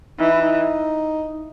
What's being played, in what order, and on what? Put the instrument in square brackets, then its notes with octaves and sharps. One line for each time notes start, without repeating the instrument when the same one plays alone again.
[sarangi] E3 [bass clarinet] D#4
[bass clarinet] E4
D#4